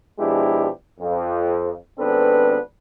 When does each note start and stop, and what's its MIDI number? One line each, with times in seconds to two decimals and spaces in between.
0.19 0.69 47
0.19 0.69 53
0.19 0.69 56
0.19 0.69 62
0.19 0.69 64
0.19 0.69 67
1.00 1.73 41
1.98 2.58 32
1.98 2.58 59
1.98 2.58 60
1.98 2.58 62
1.98 2.58 69
1.98 2.58 71